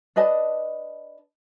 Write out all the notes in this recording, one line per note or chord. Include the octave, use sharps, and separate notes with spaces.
D4 B4 D#5 A5